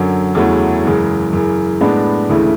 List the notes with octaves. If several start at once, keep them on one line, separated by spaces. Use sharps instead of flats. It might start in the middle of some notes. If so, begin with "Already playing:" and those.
Already playing: F#2 D3 F#3
E2 C#3 F#3 A3 E4
F#2 C#3 E3 G#3
F#2 C#3 E3
A2 G#3 B3 D4
D2 C#3 E3 A3 E4